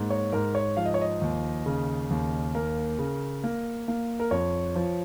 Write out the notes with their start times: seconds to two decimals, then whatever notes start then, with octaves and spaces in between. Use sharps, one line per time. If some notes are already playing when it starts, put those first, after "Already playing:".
Already playing: G#2 A#3
0.10 C#5
0.32 G#2 A#4
0.55 C#5
0.77 F3 F5
0.86 D#5
0.94 C#5
1.01 D#5
1.21 D#2
1.66 C#3
2.10 D#2
2.55 A#3 A#4
2.99 C#3
3.44 A#3
3.88 A#3
4.20 A#4
4.31 F2 C#5
4.75 F3